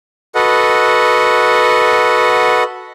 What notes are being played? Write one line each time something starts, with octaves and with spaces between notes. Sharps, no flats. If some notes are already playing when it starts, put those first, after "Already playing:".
F#4 A4 B4 D#5 F#5